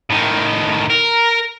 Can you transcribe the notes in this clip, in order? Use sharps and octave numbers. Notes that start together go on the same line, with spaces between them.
A2 D#3
A#4